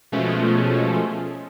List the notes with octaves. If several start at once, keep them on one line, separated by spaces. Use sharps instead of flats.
B2 F3 G#3 A3 C#4